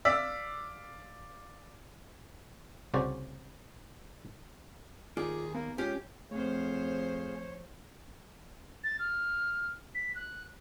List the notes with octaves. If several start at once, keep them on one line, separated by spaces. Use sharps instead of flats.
D5 F5 D6 E6 B6
C2 C#3 F#4 C5 D5
D#2 F4 G#4 D5
A#3 B3
G#3 C#4 F4 G4
F2 F3 A3 C4 G#4 C5 C#5 F5
A6
F6
B6
F#6